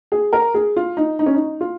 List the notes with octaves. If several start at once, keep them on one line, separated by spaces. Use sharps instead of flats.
G#4
A#4
G#4
F4
D#4
D#4
C#4
D#4
F4